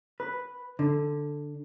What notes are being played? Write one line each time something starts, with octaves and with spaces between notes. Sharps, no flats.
B4
D3